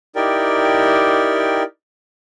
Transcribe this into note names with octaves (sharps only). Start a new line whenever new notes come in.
D#4 E4 G4 A#4 D5 G5